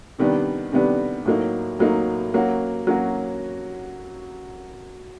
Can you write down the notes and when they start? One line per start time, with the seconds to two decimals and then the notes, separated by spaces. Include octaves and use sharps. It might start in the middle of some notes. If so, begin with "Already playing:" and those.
0.19 C3 D#3 G3 B3 D4
0.72 C3 D#3 G3 B3 D4
1.25 A2 F#3 A#3 D#4
1.79 A2 F#3 A#3 D#4
2.34 F#3 A#3 C#4 F#4
2.87 F#3 A#3 C#4 F#4